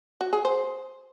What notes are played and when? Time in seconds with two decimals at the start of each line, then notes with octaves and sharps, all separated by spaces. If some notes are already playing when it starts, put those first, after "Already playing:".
0.21 F#4
0.33 G#4
0.45 C5